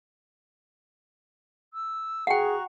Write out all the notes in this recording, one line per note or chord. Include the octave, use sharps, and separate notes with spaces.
E6
F#4 G#4 F#5 G5 A#5 C#6